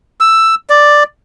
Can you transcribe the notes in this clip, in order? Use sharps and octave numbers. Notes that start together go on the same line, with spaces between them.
E6
D5